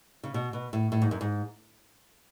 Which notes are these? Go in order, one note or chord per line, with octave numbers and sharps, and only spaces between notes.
C#3
B2
B2
A2
A2
G#2
F#2
G#2